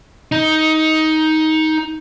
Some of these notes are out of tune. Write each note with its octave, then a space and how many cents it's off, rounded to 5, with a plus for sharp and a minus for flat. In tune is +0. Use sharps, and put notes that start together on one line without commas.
D#4 +15